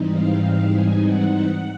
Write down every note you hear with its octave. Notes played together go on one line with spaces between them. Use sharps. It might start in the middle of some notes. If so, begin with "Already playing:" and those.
Already playing: G#2 E3 G3 C4 D#4
F5
F5
G#5
F#5
F#5